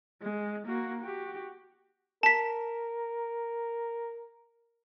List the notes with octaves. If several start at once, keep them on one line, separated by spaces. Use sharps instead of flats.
G#3
A#3 F#4
F#4 G4
A#4 A5 B6